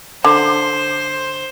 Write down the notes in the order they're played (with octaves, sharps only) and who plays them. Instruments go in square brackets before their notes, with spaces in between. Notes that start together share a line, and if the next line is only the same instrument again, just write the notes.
[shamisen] D3 [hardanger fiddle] C5